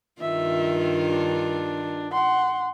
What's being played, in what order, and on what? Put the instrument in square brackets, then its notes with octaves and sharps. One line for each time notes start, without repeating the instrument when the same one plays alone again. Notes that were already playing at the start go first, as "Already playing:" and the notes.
[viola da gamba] G2 D#3 F4 [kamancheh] E5
[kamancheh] D4
F#5 C6